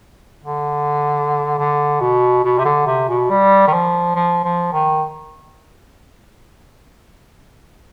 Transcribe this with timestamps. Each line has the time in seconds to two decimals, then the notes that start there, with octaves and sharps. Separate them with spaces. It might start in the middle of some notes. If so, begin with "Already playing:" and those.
0.44 D3
1.58 D3
2.01 B2
2.44 B2
2.59 C3
2.65 D3
2.86 C3
3.09 B2
3.30 G3
3.67 D#3
3.73 F3
4.15 F3
4.44 F3
4.73 D#3